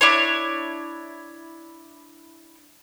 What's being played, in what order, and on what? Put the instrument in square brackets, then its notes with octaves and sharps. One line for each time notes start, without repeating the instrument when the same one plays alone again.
[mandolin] D4 E4 C#5